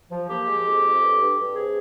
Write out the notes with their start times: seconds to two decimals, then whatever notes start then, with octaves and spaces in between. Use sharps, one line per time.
0.11 F3
0.28 A#3 G4
0.47 G#3
0.65 F2
0.83 F2
1.01 G2
1.19 G2
1.38 G2
1.55 C3 G#4